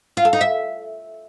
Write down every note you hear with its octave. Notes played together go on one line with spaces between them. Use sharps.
F4
A4
D#4
E5